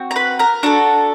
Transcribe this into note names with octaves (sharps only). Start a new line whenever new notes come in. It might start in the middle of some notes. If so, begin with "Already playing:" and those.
Already playing: C4 F#4
A#5
B4 B5
A#4 A#5
D4 F#4 A4